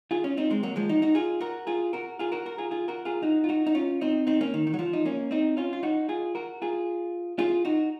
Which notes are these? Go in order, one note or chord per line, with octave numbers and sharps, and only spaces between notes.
F4 G#4
C#4 F4
C4 D#4
G#3 C4
F#3 A#3
F3 G#3
D#4 F#4
D#4 F#4
F4 G#4
F#4 A#4
F4 G#4
F#4 A#4
F4 G#4
F#4 A#4
F#4 A#4
F4 G#4
F4 G#4
F#4 A#4
F4 G#4
D#4 F#4
F4
D#4 F#4
D#4
C#4 F4
C4 D#4
C4 D#4
A#3 C#4
D#3
D#3
F#3
F3
D#4
A#3 C#4
C4 D#4
C#4 F4
F4
D#4 F#4
F4 G#4
F#4 A#4
F4 G#4
F4 G#4
D#4 F#4